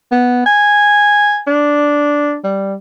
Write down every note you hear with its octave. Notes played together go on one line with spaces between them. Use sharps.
B3
G#5
D4
G3